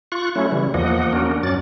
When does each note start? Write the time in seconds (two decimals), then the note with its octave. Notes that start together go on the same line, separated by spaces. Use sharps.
0.12 F4 C#6 F#6
0.35 F#3 A3 C#4 E4
0.52 C#3 E3 G3
0.74 E2 F3 A#3 D#5 F#5
1.13 A#3 C#4 D4 F#4 A#4
1.43 F#2 F#3 C#4 D5 A6